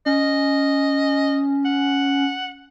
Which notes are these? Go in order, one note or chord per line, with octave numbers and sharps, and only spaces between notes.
C#4 D#5
F#5